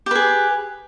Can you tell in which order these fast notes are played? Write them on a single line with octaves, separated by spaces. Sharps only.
G4 B4 G#4